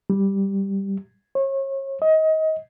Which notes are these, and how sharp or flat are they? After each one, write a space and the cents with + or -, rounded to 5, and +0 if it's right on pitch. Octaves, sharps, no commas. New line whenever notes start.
G3 +0
C#5 -35
D#5 +25